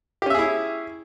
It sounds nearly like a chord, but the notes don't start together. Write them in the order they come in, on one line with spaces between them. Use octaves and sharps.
G4 C#4 E5 G#4 E4